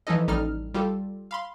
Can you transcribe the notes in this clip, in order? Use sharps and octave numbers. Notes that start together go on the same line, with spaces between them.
E3 F3 C#4 D#4 A4 D#5
A1 G3 D#4 A4 F6
G3 F4 G4 A4
F5 B5 C6